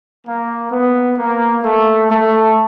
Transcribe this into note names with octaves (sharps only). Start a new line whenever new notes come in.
A#3
B3
A#3
A3
A3